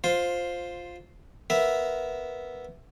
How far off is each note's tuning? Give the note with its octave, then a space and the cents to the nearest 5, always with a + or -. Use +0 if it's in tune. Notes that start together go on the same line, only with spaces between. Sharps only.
F4 +10 C5 +0
B3 +0 A#4 +0 E5 +0